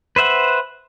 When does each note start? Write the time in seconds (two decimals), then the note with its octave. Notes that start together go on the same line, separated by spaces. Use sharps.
0.16 B4 C5 E5 F#5